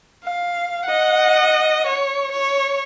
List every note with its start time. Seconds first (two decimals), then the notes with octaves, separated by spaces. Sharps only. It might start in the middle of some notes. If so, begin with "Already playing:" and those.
0.24 F5
0.85 D#5 F#5
1.87 C#5
2.32 C#5